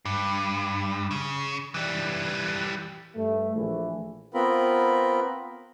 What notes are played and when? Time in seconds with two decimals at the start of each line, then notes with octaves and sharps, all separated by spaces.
0.05 G2
1.11 C#3
1.74 E3 G3
3.15 G2 A3
3.55 A#1 E3 A3
4.34 B3 C4 F4 A#4 B5